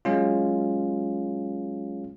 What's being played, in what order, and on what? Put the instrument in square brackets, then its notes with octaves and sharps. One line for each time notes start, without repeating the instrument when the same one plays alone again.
[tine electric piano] F#3 G#3 C#4 F4